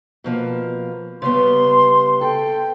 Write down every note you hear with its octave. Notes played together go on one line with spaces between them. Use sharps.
B2 F3 A#3
C#3 G3 B3 C6
A4 G5